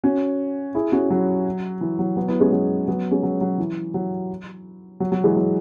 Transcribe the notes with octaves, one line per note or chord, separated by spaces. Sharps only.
C#4 F#4
E4 G#4
C#4 F#4
F#3
E3
F#3
F#3 B3
B3 E4
G#3 C#4
F#3 B3
F#3 B3
G#3 C#4
F#3
F#3
E3
F#3
F#3
F#3
E3 G#3
F#3